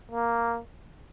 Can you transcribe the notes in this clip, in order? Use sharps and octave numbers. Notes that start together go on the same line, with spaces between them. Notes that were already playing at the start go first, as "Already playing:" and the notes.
A#3